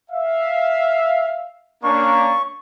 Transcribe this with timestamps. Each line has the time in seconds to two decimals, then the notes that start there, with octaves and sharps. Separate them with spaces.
0.11 E5 F5
1.84 A#3 C#4 D4 C#6